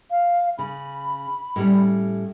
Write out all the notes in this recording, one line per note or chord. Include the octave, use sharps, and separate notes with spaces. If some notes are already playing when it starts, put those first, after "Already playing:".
F5
C#3 B5
A2 G3 C#4